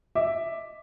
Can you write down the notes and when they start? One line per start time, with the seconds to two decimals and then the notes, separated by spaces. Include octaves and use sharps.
0.15 D#5 E5 D6